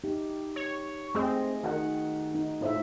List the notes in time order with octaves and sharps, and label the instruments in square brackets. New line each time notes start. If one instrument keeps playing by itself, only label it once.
[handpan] D#4 G4
[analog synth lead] C#5
[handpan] A3 G#4 D#5 [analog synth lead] C4
[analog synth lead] D#3 [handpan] F#4 F#5
[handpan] D#4
[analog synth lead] A2 [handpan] F4 C5 E5